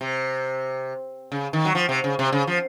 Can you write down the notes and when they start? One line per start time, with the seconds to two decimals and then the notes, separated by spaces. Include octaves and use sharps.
0.01 C3
1.32 C#3
1.53 D#3
1.65 F#3
1.75 F3
1.89 C3
2.04 C#3
2.19 C3
2.32 C#3
2.47 F3